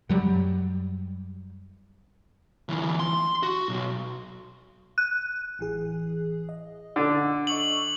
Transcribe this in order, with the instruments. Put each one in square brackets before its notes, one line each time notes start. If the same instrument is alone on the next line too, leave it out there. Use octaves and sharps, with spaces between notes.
[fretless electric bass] F#2 F#3 G3
[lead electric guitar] D2 E3
C6
F#4
B1
[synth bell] F#6
[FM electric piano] A1 E3 G#4
D#5
[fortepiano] D3
[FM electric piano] D#5 C#6 E6 [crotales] F#7